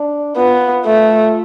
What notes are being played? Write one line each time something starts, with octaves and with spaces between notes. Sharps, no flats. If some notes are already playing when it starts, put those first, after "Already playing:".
Already playing: D4
B3 F4
A3